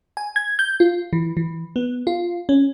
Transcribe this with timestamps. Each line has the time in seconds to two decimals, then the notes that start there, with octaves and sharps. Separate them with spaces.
0.17 G#5
0.36 G#6
0.59 G6
0.80 F4
1.13 E3
1.37 E3
1.76 B3
2.07 F4
2.49 C#4